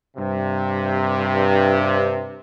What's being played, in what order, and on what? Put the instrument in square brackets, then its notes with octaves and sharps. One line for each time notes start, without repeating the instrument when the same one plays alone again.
[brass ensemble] G2 C3